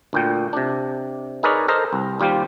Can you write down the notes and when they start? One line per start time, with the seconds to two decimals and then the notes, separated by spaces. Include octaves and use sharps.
0.13 D2 A#2 G5
0.53 C3 D4
1.43 D#4 G#4 A#4 B4 C#5 D5
1.68 A4 A#4 C5 D#5
1.93 C2
2.20 D#2 G3 F4 G4 C5